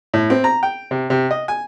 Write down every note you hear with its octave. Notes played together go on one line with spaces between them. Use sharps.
A2
C4
A#5
G5
C3
C3
D#5
G#5